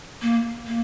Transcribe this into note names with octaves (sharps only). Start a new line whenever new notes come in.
A#3
A#3